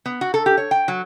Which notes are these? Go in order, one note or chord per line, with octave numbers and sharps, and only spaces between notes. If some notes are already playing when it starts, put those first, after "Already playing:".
B3
F#4
A4
G4
C#5
G5
F#3